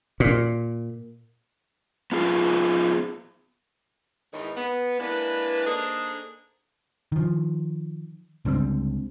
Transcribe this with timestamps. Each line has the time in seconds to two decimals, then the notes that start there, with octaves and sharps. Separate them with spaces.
0.20 A#2
2.12 B3 F4 G#4
4.33 E2 G#2 D#3 E3 D#4 C#5
4.57 B3
4.99 E3 G#3 A#3 D4 B4
5.66 A#3 D4 D#4 G#4 A4 C5
7.12 D#3 F3
8.45 C#2 D3 G3 C4